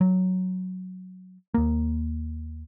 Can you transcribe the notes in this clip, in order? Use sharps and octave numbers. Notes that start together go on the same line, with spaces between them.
F#3
D#2 A#3